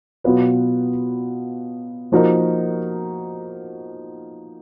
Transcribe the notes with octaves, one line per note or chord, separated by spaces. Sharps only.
B2 F#3 B3 F4 B4
F3 A#3 D#4 F#4 A#4